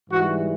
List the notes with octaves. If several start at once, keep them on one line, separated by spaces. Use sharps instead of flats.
G#2 E3 G3 F#4